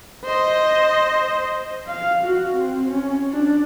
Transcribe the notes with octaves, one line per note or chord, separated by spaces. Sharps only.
C5 D#5
F5
F#4
C4
C#4
D4